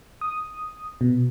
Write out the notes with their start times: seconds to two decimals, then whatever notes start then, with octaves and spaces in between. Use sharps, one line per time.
0.21 D#6
1.01 B2